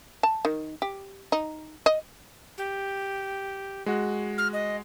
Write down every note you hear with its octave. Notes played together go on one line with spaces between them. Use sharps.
A5
D#3
G4
D#4
D#5
G4
G#3 F#4
F6
D#5